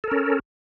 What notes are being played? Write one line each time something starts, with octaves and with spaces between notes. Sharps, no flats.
C#4 A4 A#4